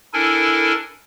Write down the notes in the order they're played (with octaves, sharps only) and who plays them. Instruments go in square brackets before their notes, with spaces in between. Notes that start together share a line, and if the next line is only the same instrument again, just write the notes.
[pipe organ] D4 E4 A4 A#4 G#5